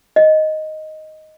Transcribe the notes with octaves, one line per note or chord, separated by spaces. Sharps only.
D#5